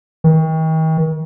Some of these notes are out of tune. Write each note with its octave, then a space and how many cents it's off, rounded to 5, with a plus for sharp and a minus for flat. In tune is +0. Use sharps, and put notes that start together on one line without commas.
D#3 +40